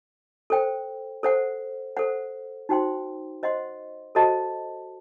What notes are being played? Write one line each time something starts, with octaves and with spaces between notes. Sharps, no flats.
A4 C5 G5
A4 C5 F#5
A4 C5 F#5
D#4 F#4 C5 G5 C6
C5 D#5 F#5 C6
F#4 A4 C5 D#5 A5